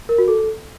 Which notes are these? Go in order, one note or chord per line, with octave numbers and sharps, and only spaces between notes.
A#4
F#4
A4